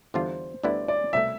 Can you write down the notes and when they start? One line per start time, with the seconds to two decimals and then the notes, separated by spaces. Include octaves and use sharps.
0.14 E2 D3 G3 D4 F4 C5
0.63 D2 D3 G3 B3 E4 D5
0.88 D5
1.13 C2 B2 A3 E5